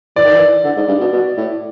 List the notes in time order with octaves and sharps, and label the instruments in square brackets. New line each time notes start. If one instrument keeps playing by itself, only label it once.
[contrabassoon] E3 [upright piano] D5
[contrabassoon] D#3
E3
D3
G#2
G2
B2
B2
A2